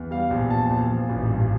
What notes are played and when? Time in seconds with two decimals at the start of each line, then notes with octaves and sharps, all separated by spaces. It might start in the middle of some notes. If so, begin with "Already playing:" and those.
Already playing: E2
0.11 G3 F5
0.30 A#1
0.50 A#2 A5
0.70 A#1
0.89 F3
1.09 A1
1.29 G2